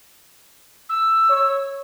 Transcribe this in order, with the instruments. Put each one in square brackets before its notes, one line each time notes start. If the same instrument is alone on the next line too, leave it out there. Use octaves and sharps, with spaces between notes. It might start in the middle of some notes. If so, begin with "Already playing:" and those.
[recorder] E6
[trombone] C#5